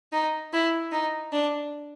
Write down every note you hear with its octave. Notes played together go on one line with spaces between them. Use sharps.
D#4
E4
D#4
D4